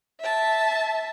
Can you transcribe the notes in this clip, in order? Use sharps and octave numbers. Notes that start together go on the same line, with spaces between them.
E5 A5